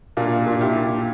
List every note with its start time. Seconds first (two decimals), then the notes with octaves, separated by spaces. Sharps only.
0.17 A#2 D4 F4
0.46 A#2
0.61 E4 G4
0.76 A#2